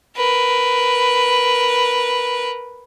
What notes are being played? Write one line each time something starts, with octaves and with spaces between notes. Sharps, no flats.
A#4 B4